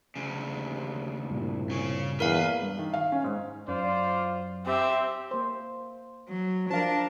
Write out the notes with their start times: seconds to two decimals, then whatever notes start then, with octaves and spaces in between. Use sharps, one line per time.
0.16 D2 C#3
0.54 D#2
1.31 C2 G2 A#2
1.70 C#3 C#4
2.20 E2 A#4 B4 F5 B5
2.62 G2
2.79 D#3
2.94 F5
3.12 C#4
3.24 G#2
3.68 F#2 F4 C5 D5
4.66 C4 G4 E5
5.31 A#3 C5
6.28 F#3
6.70 F3 D4 A#4 F5 A5